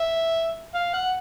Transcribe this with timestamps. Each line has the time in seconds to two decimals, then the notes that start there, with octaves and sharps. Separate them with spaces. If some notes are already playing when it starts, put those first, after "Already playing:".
Already playing: E5
0.75 F5
0.94 F#5